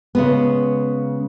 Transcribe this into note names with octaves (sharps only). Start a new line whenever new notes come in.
C#3 G#3 B3